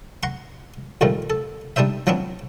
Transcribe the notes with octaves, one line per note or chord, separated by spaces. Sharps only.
F#5 A#5 C6 C#6
D2 A#2 D#3 F3 G3 A3
A4
G3 D4 D#4 C5 E5
F3 F#3 B3 C4 D4